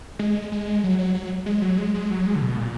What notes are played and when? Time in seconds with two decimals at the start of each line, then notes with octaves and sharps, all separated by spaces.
0.19 G#3
0.52 G#3
0.84 F#3
0.99 F#3
1.14 F#3
1.46 G#3
1.62 F#3
1.78 G#3
1.94 G#3
2.11 F#3
2.26 G#3
2.35 D3
2.42 B2
2.58 A#2